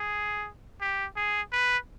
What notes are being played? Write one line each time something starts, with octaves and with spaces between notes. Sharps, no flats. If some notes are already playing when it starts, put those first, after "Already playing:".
Already playing: G#4
G4
G#4
B4